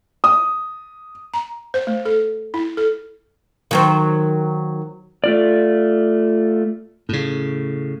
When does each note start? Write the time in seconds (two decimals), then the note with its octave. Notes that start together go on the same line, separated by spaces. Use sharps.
0.24 D#6
1.34 A#5
1.74 C5
1.87 A3
2.05 A4
2.54 E4
2.77 A4
3.71 D#3 F#3 C5
5.24 A3 F4 D5
7.09 A2 C#3